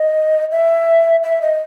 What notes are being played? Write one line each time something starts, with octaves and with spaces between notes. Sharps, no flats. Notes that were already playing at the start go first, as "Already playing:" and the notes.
Already playing: D#5
E5
E5
D#5